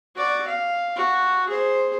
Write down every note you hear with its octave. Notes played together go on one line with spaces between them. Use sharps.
F#4 D5
F5
F#4
G#4 C5